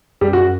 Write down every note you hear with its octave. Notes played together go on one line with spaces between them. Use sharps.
F#2 G3
F#4